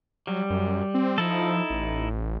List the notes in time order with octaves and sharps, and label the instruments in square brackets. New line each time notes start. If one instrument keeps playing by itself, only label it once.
[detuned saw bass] F#3 [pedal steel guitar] G3
[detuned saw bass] F#2
C4
[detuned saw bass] F3 [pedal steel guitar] D#4 E4 A4
[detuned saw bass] A1